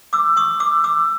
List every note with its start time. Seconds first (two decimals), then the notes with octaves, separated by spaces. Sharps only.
0.13 D6 E6
0.37 C#6 D#6
0.60 D6 E6
0.84 D6 E6